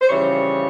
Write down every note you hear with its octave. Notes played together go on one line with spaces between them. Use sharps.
C5
F2 C#3 E3 G3 C#5